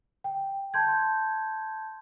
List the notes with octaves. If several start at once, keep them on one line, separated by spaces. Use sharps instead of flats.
G5
A5 C6 G6 G#6